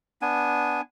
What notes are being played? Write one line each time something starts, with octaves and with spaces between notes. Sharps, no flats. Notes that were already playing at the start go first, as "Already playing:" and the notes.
B3 D4 G#5